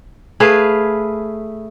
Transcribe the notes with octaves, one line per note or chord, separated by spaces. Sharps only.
A3 G#4 B4 F5